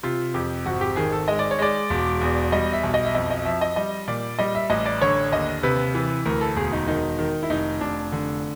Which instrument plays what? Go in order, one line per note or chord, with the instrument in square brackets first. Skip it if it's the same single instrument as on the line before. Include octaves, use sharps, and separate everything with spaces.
[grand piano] C3 F4
F2 G4
G#1 F#4
G4
D#3 G#4
A4
G#3 D#5
D5
C#5
G#3 D5
E1
E2
G3 D#5
E5
B1
D#5
E5
F2 D#5
D#5
F3 E5
D#5
G3 D#5
A#2 D5
G3 D#5
E5
A1 D#5
D5
D3 C#5
D#2 D#5
C3 B4
E3
D2 A#4
A4
E1 G#4
D#4
D#3 D#4
D#3
E4
F1 D#4
F1 D4
D3